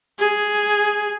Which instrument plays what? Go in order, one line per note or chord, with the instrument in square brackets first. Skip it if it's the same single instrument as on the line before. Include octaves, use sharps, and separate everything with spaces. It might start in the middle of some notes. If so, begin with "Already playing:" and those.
[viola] G#4